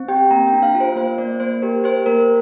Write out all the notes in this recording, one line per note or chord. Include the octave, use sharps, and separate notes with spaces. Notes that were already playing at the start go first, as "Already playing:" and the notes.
Already playing: C4
G4 G5
A#3 A#5
G5
D4
F5
F4
C5
A#3 C5
A#3 D5
A#3 C5
G4 A#4
G4 C5
A#3 A#4